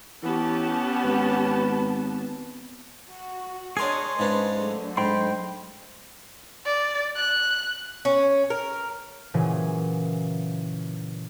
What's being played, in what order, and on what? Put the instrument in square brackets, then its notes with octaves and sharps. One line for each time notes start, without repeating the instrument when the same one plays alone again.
[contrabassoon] E3 [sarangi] B3 [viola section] C#4 G4 A5
[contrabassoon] G#1 [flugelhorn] B4
[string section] F#4
[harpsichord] D4 A#4 G#5 [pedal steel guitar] G#4 C6 [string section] C#5 D#5
[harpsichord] G#2 C#3 D4 [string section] B4
[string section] D3 F#3 A3
[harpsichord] G#2 [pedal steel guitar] G5 B5 C6
[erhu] D5
F#6
[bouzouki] C#4
A#4
[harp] A#2 C#3 E3 F#3 G#4 D#7